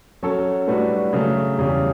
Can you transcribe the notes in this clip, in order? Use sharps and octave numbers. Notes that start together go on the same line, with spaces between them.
F#3 C#4 F#4 A4 C#5
A2 G3 D4 F#4 B4
C#3 F#3 A3
E2 C#3 G3 C#4 G4